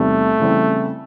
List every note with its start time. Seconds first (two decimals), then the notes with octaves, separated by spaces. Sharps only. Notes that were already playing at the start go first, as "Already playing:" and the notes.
Already playing: E2 C3 D#3 G3 A3 C4
0.40 C#3 E3 G3 C4